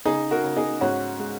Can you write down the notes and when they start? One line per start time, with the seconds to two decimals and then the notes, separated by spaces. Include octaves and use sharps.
0.05 C#3 D#4 G#4
0.31 F#4 A#4
0.44 C#3
0.57 D#4 G#4
0.81 G#2 C#4 F#4
1.19 G#3